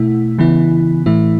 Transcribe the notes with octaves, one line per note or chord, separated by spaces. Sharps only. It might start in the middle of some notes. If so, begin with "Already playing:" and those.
Already playing: B2 A3 E4
C#3 E3 B3 E4
A2 E3 A3 E4